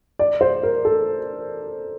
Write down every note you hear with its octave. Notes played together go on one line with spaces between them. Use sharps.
D5
C5
A#4
A4